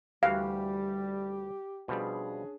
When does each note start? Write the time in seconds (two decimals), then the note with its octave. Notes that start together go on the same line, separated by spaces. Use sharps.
0.23 D2 E3 G3 F#4 G4 F5
1.88 B2 F3 G3 C#4 D4 G#4